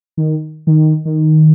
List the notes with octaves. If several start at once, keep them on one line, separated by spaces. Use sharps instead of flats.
D#3
D#3
D#3